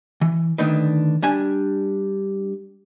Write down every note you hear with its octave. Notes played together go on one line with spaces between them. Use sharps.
E3
D3 D#3 A3 D4 D#4 B4
G3 D4 G#5